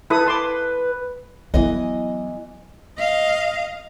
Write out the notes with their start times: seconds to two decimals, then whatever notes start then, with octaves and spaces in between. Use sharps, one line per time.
0.10 E4 A4 B4 D#6
0.26 A5 C6 D6
1.54 E3 F#3 B3 D#5
2.98 D#5 F5